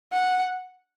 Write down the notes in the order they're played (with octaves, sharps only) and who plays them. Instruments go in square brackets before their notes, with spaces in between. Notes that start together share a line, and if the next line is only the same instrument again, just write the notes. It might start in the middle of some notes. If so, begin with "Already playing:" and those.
[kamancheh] F#5